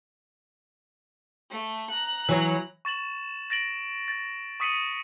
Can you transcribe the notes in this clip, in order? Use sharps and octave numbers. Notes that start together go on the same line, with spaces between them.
A3
A#5 F#6
E3 F#3
C#6 A6 E7 F#7
A6 A#6 D7 F#7
A6
C#6 D#6 B6 C#7 D#7 F#7